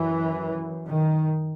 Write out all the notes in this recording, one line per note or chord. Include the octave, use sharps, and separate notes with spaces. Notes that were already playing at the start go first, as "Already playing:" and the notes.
Already playing: F#2 E3
D#3